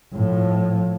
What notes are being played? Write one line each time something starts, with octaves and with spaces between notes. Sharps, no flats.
A2 F3